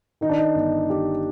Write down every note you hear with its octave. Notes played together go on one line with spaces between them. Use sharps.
D#3 D#4
D4
D#4
G1
D#3 G4